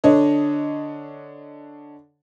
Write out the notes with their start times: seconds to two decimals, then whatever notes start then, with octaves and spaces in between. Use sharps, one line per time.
0.04 D3 D4 C#5 D#5